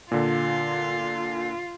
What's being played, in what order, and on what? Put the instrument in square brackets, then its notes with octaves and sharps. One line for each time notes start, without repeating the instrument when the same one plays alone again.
[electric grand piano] A#2 D3 [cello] F4